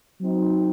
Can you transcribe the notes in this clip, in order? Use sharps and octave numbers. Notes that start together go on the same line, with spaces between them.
F#3 C4 D#4